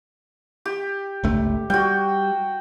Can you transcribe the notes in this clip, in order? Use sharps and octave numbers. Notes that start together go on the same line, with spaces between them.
G4
G1 C#2 A3
G3 F#4 G5